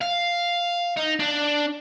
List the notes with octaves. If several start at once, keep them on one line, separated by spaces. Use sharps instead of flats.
F5
D#4
D4